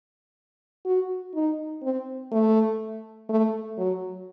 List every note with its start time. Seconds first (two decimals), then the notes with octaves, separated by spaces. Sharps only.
0.85 F#4
1.35 D#4
1.83 C4
2.32 A3
3.29 A3
3.78 F#3